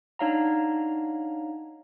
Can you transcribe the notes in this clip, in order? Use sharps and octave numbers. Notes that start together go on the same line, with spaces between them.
D4 D#4 C#5 F5 F#5 A#5